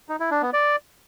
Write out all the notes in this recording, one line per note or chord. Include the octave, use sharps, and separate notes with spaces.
D#4
E4
D4
B3
D5